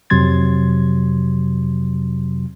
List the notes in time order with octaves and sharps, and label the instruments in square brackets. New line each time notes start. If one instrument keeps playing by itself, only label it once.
[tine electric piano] F2 C3 F#3 C6 G#6 A6